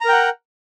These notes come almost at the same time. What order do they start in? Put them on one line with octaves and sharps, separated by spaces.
A#5 A#4 G5 F#5